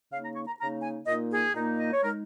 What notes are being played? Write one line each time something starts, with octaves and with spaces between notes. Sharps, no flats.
C#3 A#3 D#4 F5
A#5
C#6
A#5
C#3 A#3 D#4 A#5
G#5
A#2 A#3 D#4 D#5
G#4
A#2 A#3 D#4
D#5
C#5
G#3 D#4 A#4